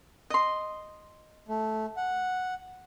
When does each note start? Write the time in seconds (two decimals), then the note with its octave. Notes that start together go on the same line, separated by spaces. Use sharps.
0.30 D#5 C6
1.48 A3
1.97 F#5